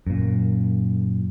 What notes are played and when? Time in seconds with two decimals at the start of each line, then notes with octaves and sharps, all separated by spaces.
0.07 F#2 A#2